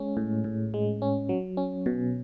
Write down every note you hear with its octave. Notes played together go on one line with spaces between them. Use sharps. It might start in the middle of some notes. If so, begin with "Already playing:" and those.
Already playing: G#3 C#4
A2
A2
G#3
C#4
F#3
C#4
B2